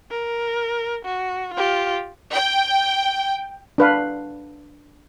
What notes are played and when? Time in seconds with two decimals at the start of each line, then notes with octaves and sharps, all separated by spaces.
0.11 A#4
1.05 F#4
1.54 F4 G4
2.31 G5
3.78 D4 B4 F5